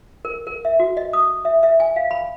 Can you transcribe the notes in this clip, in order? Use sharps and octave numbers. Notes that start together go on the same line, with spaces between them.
A#4
A#4
E5
F#4
D#5
D#6
E5
E5
G#5
F5
B5